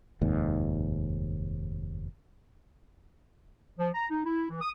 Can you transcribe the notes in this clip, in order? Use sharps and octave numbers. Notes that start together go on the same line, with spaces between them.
F1 D#2 G#2
F3
A#5
D#4
E4
E3
D#6